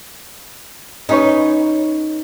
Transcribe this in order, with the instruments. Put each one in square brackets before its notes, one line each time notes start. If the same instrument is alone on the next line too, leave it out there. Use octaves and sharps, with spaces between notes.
[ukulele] C#4 B4 C#5 [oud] D#4